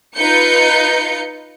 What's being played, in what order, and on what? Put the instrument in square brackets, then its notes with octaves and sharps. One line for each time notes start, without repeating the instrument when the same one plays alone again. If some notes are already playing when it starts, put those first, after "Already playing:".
[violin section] D#4 F4 B4 G6 C#7